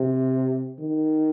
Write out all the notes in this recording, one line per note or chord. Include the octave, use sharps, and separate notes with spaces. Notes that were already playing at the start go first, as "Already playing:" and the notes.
Already playing: C3
D#3